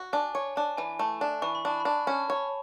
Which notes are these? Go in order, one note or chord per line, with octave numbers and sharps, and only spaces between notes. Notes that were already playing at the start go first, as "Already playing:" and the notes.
Already playing: F#4
D4 G#5
C#5 G#5
D4 A5
E3 G#5
A3
D4
E3 C#6
B5
D4 A5
B5
D4
C#4 A5
C#5